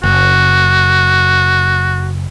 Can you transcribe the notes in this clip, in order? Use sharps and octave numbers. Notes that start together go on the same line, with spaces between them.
F#1 F#4